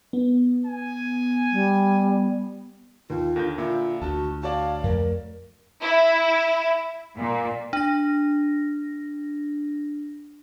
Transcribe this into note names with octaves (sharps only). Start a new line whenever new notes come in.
B3
G#5
G3
D#2 F4
D#2 D3 A#4 G6 A#6
A#2 E4 F4
D2 F#4 A5
F#4 C#5 D5 F5 A5
F2 A3 A#4
E4
A#2
D4 A#6